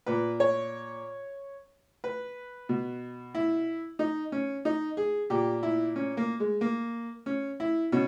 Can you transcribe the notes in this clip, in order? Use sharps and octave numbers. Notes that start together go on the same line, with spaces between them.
A#2 B4
C#5
B4
B2
E4
D#4
C#4
D#4
G#4
A#2 G4
E4
C#4
A#3
G#3
A#3
C#4
E4
B2 C#4